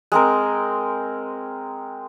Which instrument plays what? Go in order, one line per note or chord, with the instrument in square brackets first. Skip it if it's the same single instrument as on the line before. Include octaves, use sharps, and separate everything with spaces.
[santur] G#3 C4 A#4